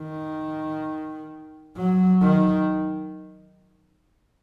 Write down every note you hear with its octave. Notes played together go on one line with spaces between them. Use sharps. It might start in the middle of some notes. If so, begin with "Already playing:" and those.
Already playing: D#3
F#3
D#3